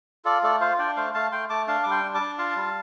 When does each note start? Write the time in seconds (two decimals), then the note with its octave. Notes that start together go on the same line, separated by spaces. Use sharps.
0.25 F4 A4 D5
0.43 A3 A4 D5
0.61 F4 C5 F5
0.78 D4 D5 G5
0.96 A3 C5 F5
1.14 A3 F5 A5
1.32 A3 G5 C6
1.50 A3 A5 D6
1.67 D4 F5 A5
1.83 G3 D6
1.91 G5 C6
2.03 D4
2.15 A5 D6
2.21 D4
2.38 F4 F5 A5
2.56 G3